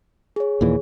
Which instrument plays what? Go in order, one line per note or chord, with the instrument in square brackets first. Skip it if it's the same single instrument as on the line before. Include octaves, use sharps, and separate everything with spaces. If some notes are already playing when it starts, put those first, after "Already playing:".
[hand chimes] G#4 C#5
[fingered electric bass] D#2 A#2 E3